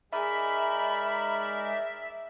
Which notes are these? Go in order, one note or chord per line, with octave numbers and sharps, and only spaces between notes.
G#3 D#4 A#4 D5 E5 B5